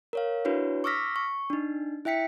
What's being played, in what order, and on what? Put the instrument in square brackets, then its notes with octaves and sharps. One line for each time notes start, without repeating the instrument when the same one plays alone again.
[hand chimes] A#4 C#5 F5
D4 E4 F#4 B4 C#5
C#6 D6 E6 F6 A#6 B6
C#6
D4 D#4
E4 E5 G5 B6 C#7